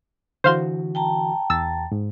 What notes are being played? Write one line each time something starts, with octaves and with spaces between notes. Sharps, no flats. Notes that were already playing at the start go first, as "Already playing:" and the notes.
D3 E3 F#4 C5 F5 C6
G5 A5 A#5
E2 E6 A6
G#2